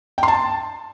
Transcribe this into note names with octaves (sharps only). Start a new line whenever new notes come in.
G5
C6
A5